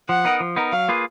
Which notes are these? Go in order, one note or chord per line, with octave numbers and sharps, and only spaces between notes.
F3 F#5
B3 D#4 A#4
F3
B3 D#4 A#4
F#3 F5
A#3 F4 G#4 B4